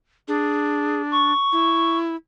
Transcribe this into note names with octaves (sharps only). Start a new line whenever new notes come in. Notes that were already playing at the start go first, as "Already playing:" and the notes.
D4 G#4
C#6
E4